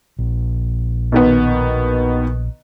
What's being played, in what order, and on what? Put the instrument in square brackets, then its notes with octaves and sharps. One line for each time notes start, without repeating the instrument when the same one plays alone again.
[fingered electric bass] A#1
[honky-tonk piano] B2 D#3 B3